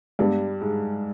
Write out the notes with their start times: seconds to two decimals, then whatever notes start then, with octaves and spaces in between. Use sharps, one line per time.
0.19 G2 G3 G#3 B3 D4
0.61 G#2 G#3